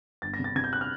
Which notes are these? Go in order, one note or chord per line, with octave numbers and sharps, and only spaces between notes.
G1 A6
A#6
C3
A6
C3 G#6
G6
F#6
F6